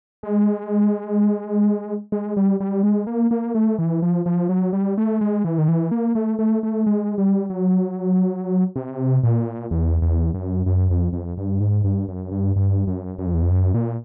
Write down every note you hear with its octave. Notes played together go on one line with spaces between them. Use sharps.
G#3
G#3
G3
G3
G#3
A#3
A#3
A3
E3
F3
F3
F#3
G3
A3
G#3
E3
D#3
E3
A#3
A3
A3
A3
G#3
G3
F#3
C3
A#2
E2
E2
F#2
F#2
F2
F2
G2
G#2
G2
F#2
G2
G2
F#2
F#2
F2
E2
F2
F#2
A#2